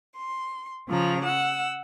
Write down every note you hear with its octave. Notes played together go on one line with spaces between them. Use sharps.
C6
C#3 F3 A#5
F#5 E6